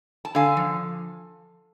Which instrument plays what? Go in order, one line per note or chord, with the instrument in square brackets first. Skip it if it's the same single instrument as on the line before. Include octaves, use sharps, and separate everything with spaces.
[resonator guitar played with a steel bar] A5
D3 F5 G#5
F3